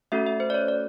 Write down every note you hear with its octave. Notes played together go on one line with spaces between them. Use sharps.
A3 C#4 F#4 A4 E5
E5
C5
D5
C#5
D5